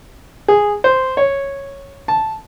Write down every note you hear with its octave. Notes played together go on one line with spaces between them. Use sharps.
G#4
C5
C#5
A5